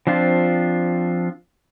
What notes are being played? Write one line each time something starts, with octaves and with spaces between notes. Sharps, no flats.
F3 C4 D4 F4